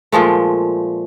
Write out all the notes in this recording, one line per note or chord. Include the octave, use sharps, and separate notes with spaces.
A#2 F3 G#3 A3